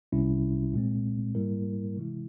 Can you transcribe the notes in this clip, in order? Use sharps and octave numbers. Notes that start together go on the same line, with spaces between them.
C2 C3 G3 C#4 E4
A#2 G#3 C4
G#2 G3 A#3 E4 A#4
C3 E3 G#3 E4